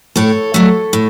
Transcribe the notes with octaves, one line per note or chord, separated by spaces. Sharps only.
A2 A4 C#5
F#3 A3
A2